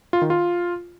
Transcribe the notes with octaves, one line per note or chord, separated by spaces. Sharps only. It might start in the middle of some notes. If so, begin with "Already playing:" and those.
F4
D#3
F4